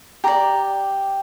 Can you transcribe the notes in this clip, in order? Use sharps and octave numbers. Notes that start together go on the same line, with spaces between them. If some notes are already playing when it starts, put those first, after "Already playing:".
G4 D5 A#5